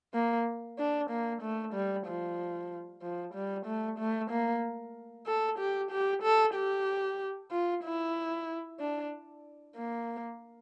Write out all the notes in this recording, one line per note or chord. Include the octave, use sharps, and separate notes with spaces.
A#3
D4
A#3
A3
G3
F3
F3
G3
A3
A3
A#3
A4
G4
G4
A4
G4
F4
E4
D4
A#3